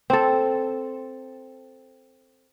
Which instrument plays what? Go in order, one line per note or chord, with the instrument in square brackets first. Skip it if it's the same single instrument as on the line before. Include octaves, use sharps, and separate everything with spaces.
[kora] C4 A4